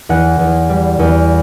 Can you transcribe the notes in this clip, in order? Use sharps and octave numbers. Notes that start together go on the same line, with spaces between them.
E2 F#5
E2
G3
E2